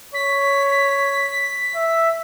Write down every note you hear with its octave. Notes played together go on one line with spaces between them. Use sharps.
C#5 B6
E5